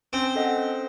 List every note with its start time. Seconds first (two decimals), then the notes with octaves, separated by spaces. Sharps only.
0.13 C4 C#4
0.35 A4 D#5 F#5
0.57 C#4